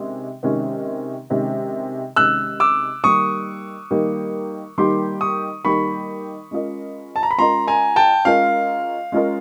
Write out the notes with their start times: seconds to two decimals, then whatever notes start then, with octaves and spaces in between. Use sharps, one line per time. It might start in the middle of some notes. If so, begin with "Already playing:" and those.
Already playing: C3 D#3 G#3 C#4
0.43 C3 D#3 G#3 C#4
1.30 C3 D#3 G#3 C#4
2.16 C3 D#3 G#3 C#4 E6 F#6
2.60 D6 E6
3.04 D#3 G3 A#3 D#4 G4 C#6 D#6
3.91 D#3 G3 A#3 D#4 G4
4.78 D#3 G3 A#3 D#4 G4 C6 D6
5.21 C#6 D#6
5.64 D#3 G3 A#3 D#4 G4 B5 C#6
6.51 G#3 C#4 F4 A#4 D#5
7.16 A5
7.23 A#5
7.31 B5
7.38 G#3 C#4 F4 A#4 D#5 A#5 C6
7.68 G#5 A#5
7.96 G5 A5
8.25 G#3 C#4 F4 A#4 D#5 F5
9.12 G#3 C#4 F4 A#4 D#5